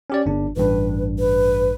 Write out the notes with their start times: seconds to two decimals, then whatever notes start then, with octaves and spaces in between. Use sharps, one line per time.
0.10 C#4 G4 D5
0.26 G1 D4
0.57 A1 G2 B4
1.19 B4